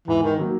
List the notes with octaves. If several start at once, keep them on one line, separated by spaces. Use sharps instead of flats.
G#2 E3
D#3
D#3 F#3 A#3